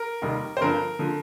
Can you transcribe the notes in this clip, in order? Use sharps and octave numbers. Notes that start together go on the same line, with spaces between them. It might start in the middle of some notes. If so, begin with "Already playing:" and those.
Already playing: A#4
F1 D#2 D#3 G3
C5
G1 G2 D3 F3 A#4
D3 F3